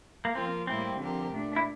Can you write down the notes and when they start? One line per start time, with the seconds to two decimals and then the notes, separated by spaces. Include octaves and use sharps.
0.25 A#3
0.35 F3 A#3 C4 F4 A#4
0.67 A2 G3 A#3 C4 E4 G4
0.99 D3 F3 C4 G4 A#4
1.31 A#2 A3 D4
1.56 E4